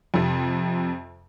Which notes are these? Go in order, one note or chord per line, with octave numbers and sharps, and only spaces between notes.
F2 C3